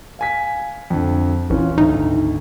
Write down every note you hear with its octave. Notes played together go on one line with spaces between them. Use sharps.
F5 G#5 B6
F2 D3
A#1 E3 C#4 F4
G#1 D2 D#4